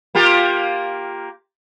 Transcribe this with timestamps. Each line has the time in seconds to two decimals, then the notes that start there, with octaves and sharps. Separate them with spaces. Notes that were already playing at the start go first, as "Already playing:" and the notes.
0.15 A#3 F4 G4